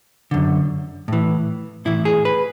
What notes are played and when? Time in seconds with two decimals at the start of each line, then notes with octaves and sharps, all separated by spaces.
0.31 F#2 D3
1.08 A2 E3
1.85 A2 E3 E4
2.05 G#4
2.25 B4